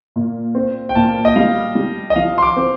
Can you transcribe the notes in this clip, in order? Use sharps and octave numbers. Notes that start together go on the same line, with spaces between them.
A#2
C4
G5
A#2 A5
D#5
G3 F5
G3
D#5
F3 F5
C6
D6
C4